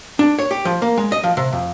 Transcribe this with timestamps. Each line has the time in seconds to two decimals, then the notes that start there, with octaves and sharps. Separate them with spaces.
0.19 D4
0.39 C#5
0.51 G4
0.65 F3
0.82 A#3
0.97 G#3
1.12 D#5
1.23 F3
1.37 C3
1.53 F2